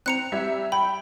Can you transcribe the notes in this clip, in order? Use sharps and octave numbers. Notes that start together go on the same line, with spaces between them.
C4 A#5 F#6 C#7 F7
G3 E5 G#6
G5 B5